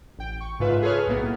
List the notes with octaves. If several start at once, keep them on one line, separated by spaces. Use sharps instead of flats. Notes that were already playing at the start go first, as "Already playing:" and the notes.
A1 G5
C#6
G#2 C#3 F4 B4 E5
G#4 A4 B4 C#5 F6
B1 A2 A#3 B3